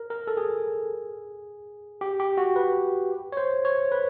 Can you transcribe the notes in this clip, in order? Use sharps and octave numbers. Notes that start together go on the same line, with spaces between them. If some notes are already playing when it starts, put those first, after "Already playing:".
Already playing: A#4
A#4
A4
G#4
G4
G4
F#4
B4
C#5
C5
C#5
B4